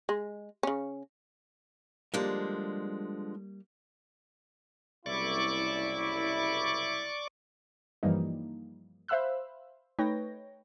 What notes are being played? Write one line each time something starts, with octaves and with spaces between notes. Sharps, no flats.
G#3
C#3 C#4
D3 F3 G3 G#3 A#3 D4
F#1 C2 E4 D5 C#6 D6
G2 E3 F3 G3 A#3 D#4
C5 E5 F5 B5 E6 F#6
A3 D#4 B4 C#5 G5 A#6